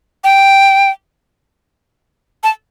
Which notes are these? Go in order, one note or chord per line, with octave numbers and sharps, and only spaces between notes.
G5
A5